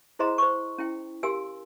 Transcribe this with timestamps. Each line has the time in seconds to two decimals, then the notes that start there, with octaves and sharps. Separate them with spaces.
0.19 E4 G#4 C5 D#5 A#5 C6
0.38 C5 C#6
0.78 C#4 E4 G5
1.23 G4 A#4 F5 G#5 C6 E6